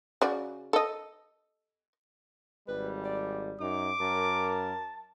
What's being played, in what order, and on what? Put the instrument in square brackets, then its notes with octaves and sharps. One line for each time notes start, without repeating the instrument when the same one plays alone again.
[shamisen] C#3 F#4 D5
A4 D#5
[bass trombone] G#1 [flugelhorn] G3 [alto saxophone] B4
[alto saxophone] D5
[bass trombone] F#2 [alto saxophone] D#4 [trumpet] D6
[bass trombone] F#2 [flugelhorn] A#4 [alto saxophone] A5